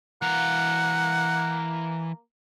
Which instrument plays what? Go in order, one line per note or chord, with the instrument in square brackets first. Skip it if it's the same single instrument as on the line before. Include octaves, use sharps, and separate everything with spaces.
[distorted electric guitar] E3 F5 [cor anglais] A#3 [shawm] F#5